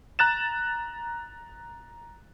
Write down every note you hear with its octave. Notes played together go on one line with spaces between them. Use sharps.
A#5 F#6 A6 E7